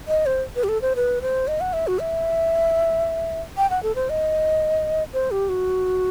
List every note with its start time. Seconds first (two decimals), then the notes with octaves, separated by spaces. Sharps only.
0.08 D#5
0.26 C5
0.56 B4
0.64 G4
0.69 A4
0.82 C5
0.96 B4
1.22 C5
1.48 D#5
1.61 F#5
1.73 E5
1.87 F#4
1.99 E5
3.57 G5
3.70 F#5
3.83 A4
3.95 C5
4.10 D#5
5.13 C5
5.31 G4
5.49 F#4